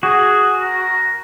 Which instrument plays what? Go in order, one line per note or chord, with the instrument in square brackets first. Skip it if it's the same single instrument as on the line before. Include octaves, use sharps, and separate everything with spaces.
[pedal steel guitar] F#4 [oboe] G#4
[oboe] A#4